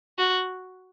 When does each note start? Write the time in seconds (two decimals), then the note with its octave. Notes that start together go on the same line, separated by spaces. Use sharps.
0.18 F#4